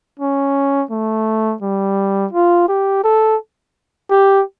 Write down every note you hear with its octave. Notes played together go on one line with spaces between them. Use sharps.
C#4
A3
G3
F4
G4
A4
G4